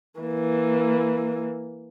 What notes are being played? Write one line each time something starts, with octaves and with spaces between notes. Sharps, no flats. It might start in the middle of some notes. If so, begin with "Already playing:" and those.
E3 A#3